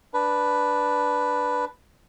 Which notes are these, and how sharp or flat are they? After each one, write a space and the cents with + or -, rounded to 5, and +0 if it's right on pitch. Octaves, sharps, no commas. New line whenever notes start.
D4 +0 B4 +0